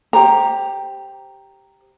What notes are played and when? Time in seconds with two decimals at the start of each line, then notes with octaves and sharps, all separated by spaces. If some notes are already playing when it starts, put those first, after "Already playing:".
0.13 G4 C5 A#5